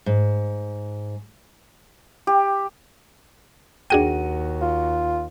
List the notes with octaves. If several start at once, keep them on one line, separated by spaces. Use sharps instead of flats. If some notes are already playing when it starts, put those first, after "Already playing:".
G#2
G4
D#2 D4 F#4 G#4 G5 D#7
F4